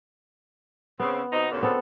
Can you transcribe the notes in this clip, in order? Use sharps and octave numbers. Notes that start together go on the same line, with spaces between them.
C#3 B3 C4
B2 C4 D#4
D2 A#2 C#3
B3 C4 A4